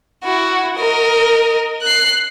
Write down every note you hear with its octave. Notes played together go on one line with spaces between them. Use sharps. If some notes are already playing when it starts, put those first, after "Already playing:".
E4 F#4
A#4 D#5
F#6 C7